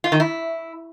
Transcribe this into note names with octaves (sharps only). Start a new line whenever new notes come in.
F4
D#3
E4